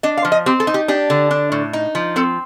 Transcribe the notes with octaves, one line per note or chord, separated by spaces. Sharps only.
D4 D#5
F5
F3
D#5
C4 G4
A4
D#4
G4
D4 G4
D3
D4
A2
D#4
F3
C4 A4